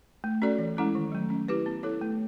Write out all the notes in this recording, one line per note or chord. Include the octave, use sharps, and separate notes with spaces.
A3
C#4 F#4 A4 D5
E3
G#3 C#4 E4 A4
D#3
F#3 A3
C#4
E4 G4 B4
B3
E4 A4 C#5
A3